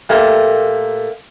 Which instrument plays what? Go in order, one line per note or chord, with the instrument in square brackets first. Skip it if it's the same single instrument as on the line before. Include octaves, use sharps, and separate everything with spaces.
[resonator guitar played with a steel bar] A#2 A3 A#3 G4